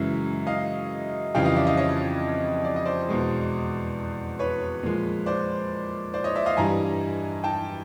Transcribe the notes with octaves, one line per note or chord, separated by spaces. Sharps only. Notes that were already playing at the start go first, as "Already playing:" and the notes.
Already playing: F#2 C#3 E3 G#3 E5
D#5 F5
F2 C#3 E3 G3 F5 G5
D#5 F5
D5 E5
D#5 F5
C#5 D#5
D5
D#5
C5 D5
E2 B2 G#3
B4 C#5
A#2 F3 G#3
C5 D5
C5 D5
C#5 D#5
D5 E5
D#5 F5
G2 E3 G3 G#5 A#5
G5 A5